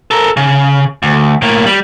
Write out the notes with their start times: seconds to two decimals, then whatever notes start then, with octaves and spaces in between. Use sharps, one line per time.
0.11 A4 A#4
0.37 C#3
1.03 D2
1.42 A2 A#3
1.66 G3